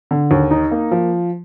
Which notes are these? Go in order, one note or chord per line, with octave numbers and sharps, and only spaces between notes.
D3
D#2
D#4
A#3
F3